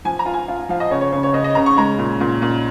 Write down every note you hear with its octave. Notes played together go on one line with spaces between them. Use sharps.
F3 G#5
A#5
F4
G#5
F4
F3 F5
D#5
C#3 C#5
C#5
C#3 C#5
C#5
C#3 D#5
D#5
C#3 A#5
C#6
G#3 A#5
A#2
A#2
A#2